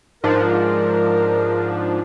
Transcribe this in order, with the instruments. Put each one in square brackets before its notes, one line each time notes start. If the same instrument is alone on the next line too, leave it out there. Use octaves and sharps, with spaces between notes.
[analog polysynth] G#2 F3 D4 [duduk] A#4